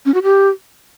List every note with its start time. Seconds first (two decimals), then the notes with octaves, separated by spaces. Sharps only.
0.05 C#4
0.14 F#4
0.23 G4